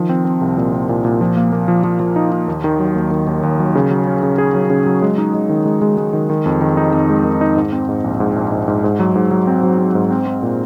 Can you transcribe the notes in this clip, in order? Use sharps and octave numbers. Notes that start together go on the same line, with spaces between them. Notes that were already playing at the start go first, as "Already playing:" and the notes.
Already playing: D#3 F3
C4
C4
C2
A#2
C4
A#2
A#2
F3
A#3
A#3
F3
F3
F3
D#4
D#4
D#2
D#3
F#3
D#2
D#3
D#2
D#2
F#3
C#3
F#3
C#4
C#3
G#4
F#3
C#3
F#3
G#3
D#4
G#3
D#3
G#3
G#3
G#3
D#3
D#3
F2
D#3
D#4
F2
G#3
D#3
D#4
G#2
C4
G#2
A#1
G#2
A#1
G#2
G#2
G#2
F#3
G#2
F#3
C4
F#3
C4
G#2
C4
C4
A#2